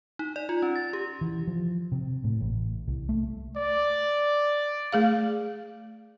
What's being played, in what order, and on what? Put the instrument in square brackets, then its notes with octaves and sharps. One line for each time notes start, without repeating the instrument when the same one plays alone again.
[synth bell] D#4
D5
F4
C#4
A6
G4
[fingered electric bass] E3
F3
C3
A2
A1
C2
A3
[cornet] D5
[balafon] A3 G#4 F5